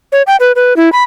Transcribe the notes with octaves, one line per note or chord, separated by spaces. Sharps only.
C#5
G5
B4
B4
E4
B5